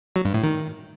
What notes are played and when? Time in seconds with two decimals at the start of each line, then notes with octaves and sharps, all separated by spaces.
0.16 F#3
0.25 G2
0.34 A2
0.43 D#3